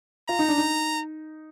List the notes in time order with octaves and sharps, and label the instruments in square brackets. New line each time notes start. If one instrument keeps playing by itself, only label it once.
[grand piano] F4 [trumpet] A#5
[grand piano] D#4
D4
D#4